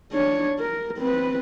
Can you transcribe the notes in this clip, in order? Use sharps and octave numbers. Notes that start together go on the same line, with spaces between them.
D4 C#5
A#4
C4 B4